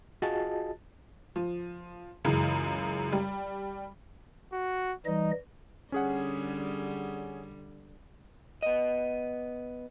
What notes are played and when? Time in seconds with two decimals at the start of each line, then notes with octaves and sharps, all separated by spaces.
0.22 F4 F#4 G#4 D#5 A5 A6
1.36 F3
2.24 C#2 F#2 C#3 E3
3.13 G3
4.53 F#4
5.06 E3 G3 D#4 D#5
5.92 D3 G3 C#4 G#4 F#5
8.62 B3 D#5